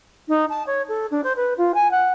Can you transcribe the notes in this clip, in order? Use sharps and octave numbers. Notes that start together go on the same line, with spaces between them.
D#4
A5
C#5
A4
D4
C5
B4
F4
G#5
F#5